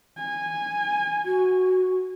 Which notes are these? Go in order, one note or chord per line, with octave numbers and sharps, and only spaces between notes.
G#5
F#4